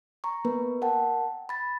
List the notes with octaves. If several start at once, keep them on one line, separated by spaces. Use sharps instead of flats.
A#5 C#6
A#3 B3 A#4 B4
A#4 F#5 G5 A5
B5 A6